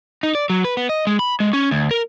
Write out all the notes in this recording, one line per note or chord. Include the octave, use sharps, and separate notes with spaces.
D#4
D5
F#3
B4
B3
D#5
G#3
B5
G#3
C#4
D2
A#4